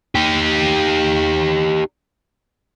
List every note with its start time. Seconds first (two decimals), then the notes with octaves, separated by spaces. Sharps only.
0.15 D#4 G4